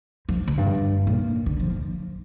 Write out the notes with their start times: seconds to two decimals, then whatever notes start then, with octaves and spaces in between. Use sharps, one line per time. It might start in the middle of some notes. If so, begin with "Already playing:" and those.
0.29 F3
0.48 D3
0.57 G2
1.07 A#2
1.46 D3
1.60 F3